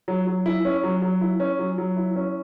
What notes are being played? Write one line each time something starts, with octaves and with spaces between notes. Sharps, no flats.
F#3
F#3
E4
C#4
F#3
F#3
E4
C#4
F#3
F#3
E4
C#4